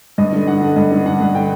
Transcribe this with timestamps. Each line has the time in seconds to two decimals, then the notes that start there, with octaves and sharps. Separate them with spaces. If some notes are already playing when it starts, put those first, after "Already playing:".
0.18 G2 D#5
0.33 D3
0.47 D3 F#5
0.62 D3
0.76 G2 D#5
0.92 D3
1.06 D3 F#5
1.20 G2
1.35 D3 G5